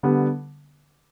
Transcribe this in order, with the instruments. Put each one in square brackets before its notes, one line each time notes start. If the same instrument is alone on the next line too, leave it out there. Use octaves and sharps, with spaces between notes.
[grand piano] D3 G3 B3